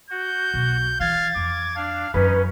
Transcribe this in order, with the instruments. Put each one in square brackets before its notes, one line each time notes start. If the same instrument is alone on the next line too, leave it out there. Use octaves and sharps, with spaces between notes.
[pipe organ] F#4 [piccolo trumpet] G6
[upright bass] B1 B2
[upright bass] E3 [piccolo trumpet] F5 [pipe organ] G#6 A6
[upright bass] F2 [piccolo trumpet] D6
[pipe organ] D4 [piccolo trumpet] F5
[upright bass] F#2 E3 [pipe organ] C#4 [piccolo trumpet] D#4 [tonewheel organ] B4